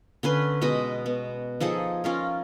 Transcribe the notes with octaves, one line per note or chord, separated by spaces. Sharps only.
D3 C#4 B4 C6
B2 G#3 D#5 B5
B3
F3 D#4 G#4 A4
C#4 F4 A#4